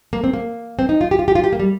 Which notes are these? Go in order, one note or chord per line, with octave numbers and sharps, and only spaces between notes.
A#3
C4
A#3
C4
D#4
F4
G4
F4
G4
F4
G4
A#3
G3